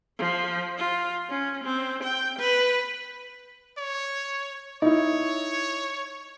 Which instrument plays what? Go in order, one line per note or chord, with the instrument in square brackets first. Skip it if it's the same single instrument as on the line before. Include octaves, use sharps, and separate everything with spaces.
[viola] F3
F4
C#4
C4
G5
B4
[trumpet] C#5
[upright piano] D#4 E4 [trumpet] C#5